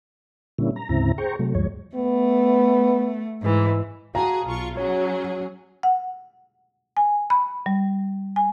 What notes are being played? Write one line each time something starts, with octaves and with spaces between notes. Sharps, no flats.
A#2 D3 G3 A#3 C#4 E4
A#5
D2 G#2 C#3 C4 E4 A#5
G#4 C5 G5 A#5 C#6
C3 F#3 A3
D2 G2 F3 G#3 C#5
A3 B3
G#2 E3
F#4 G#4 F5 A5 A#5
B1 F4 C#6
F#3 C#4 G#4 C#5
F#5
G#5
B5
G3
G#5